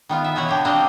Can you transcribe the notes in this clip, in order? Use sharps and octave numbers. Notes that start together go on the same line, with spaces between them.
D#3 B3 F4
E5
B2 E3 F#4 C#5 F#5
D3 G4
A#3 C4 D4 G4 C5 D#5